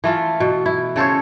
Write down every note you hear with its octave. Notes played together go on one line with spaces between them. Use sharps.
E3 A3 F4
B2
E4
C#3 A4 C5 C#5